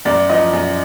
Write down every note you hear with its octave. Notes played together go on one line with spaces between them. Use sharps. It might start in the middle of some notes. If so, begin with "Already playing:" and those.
F#2 D5
F3 D#5
F#2